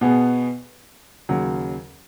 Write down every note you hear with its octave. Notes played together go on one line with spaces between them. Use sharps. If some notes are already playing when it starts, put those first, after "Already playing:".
B2 B3 G#4
D#2 C#3 F#3